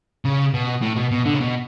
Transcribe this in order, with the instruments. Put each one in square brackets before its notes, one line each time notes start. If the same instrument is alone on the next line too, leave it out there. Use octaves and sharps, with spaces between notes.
[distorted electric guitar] C#3
B2
A2
B2
B2
D3
C#3
B2